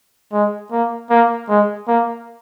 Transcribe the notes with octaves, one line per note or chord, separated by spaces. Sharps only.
G#3
A#3
A#3
G#3
A#3